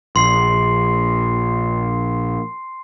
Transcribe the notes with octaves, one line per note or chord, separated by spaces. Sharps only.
A#1 C6 C7